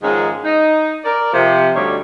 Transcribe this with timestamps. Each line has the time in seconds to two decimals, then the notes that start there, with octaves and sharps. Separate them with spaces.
0.03 G#2 D#3 F3 G#3 C#4
0.45 D#4
1.05 A#4 D5
1.33 C3 F3
1.75 D2 G3 D4 D#4 C#5